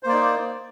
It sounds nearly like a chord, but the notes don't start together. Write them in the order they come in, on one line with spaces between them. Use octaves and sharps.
C5 A#3 D5 D#4